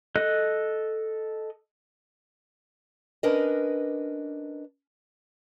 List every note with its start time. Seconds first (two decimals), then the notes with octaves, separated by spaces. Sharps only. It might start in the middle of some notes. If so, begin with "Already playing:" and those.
0.16 A4 D#5 F#6
3.23 C#4 D4 A#4 B4 D#5